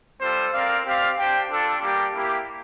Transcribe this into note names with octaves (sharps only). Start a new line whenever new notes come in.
G3 C4 F4 A4 C5
C4 F4 A#4 D5 F5
C4 G4 D5 F5
D4 G4 C5 G5
D4 F4 A4
G3 A#3 D4 G4
A#3 E4 G4